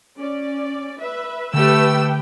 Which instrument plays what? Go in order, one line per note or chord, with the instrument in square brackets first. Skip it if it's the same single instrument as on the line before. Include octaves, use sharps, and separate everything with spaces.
[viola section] C#4 D5
B4 E5
[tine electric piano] D3 [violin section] A3 E6 [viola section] G4 B4 G5